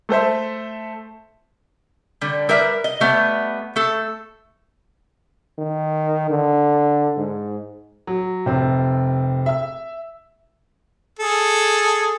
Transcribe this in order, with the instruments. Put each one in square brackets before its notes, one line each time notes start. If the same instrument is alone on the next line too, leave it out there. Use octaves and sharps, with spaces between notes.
[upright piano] A3 A4 C5 E5
[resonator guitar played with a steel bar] D3 G3
G3 A#4 B4 E5
D#5
G3 A3 B3
A3 A4
[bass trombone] D#3
D3
G#2
[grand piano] F#3
[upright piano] F1 [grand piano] C3 C4
[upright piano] E5 E6
[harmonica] G#4 A4